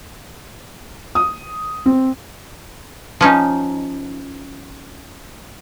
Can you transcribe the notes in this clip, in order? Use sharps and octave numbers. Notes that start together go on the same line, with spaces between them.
D#6
C4
F3 C#4 D#4